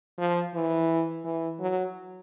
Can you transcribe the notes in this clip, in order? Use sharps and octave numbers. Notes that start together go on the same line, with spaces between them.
F3
E3
E3
F#3